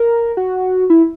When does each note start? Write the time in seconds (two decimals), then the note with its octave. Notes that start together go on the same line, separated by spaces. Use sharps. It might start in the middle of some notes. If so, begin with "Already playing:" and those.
Already playing: A#4
0.37 F#4
0.90 E4